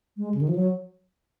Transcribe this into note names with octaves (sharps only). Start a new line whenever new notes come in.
G#3
C#3
D#3
F3
F#3